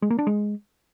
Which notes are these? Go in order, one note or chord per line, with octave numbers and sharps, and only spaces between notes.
G#3
A#3
D4
G#3